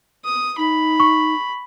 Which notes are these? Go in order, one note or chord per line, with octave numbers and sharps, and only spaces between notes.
D#6
D#4 B5
C#6